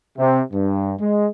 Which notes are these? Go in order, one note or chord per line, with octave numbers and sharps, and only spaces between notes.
C3
G2
G#3